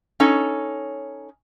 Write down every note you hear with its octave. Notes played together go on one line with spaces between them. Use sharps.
C#4 D#4 A4 C#5